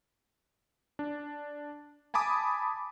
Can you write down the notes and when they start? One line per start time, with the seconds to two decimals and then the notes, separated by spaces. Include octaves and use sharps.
0.99 D4
2.14 G#5 A5 B5 D6 D#6